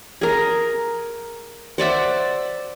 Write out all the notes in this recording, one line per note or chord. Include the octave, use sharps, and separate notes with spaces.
G#4 A#4
C5 D5 E5 F#5